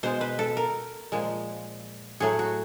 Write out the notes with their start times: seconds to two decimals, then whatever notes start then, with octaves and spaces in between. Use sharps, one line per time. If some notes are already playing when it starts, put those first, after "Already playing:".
0.03 B2 G#3 C5
0.21 B4
0.39 A4
0.57 A#4
1.12 A#2 F3 G#3
2.20 A2 F#3 A3 G#4
2.39 F#4